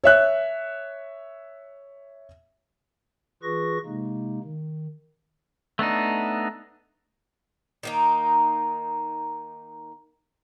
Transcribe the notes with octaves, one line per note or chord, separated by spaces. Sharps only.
C#5 E5 F#6
E3 F4 G#4 B4 C#6 A#6
C3 G#3 A#3 D#4
D#3
A3 B3 D4 D#4
D#3 A#3 D#4